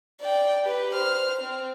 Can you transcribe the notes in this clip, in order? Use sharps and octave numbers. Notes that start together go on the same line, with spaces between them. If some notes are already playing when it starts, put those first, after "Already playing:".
D5 G5
G4 B4
C5 F6
C4